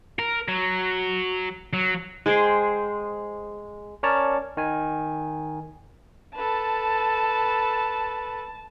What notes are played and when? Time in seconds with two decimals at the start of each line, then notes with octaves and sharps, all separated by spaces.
0.19 A#4
0.48 F#3
1.73 F#3
2.26 G#3 G#4 C5 G5
4.03 C#4 A#4 C#5 D5 A5
4.57 D#3 G#5
6.35 A4 B4 A5